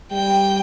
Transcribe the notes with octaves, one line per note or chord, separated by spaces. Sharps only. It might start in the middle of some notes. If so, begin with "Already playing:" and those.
G3 G5